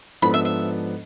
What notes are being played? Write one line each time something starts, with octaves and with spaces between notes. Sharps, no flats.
G#2 F3 B3 D4 A4 B5
E5
E5